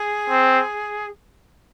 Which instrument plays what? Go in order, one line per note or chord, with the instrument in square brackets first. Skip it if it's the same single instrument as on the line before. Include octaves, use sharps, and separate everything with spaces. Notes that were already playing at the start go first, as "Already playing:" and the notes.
Already playing: [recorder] G#4
[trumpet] C4